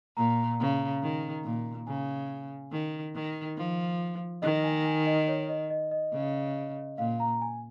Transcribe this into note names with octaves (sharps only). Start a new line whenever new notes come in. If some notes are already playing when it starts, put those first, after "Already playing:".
A#2 A#5
C#3
D#3
A#2
C#3 G#5
D#3
D#3
F3
D#3 D#5
G#5
G#5
D#5
C#5
D#5
D#5
D#5
C#3
A#2 F5
A#5
G#5